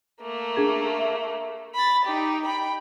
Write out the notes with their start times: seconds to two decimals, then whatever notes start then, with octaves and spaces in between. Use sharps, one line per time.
0.22 A3 A#3
0.56 D4 G#4 G#6
0.99 E5
1.75 B5 A6
2.05 D#4 G4
2.45 G5 B5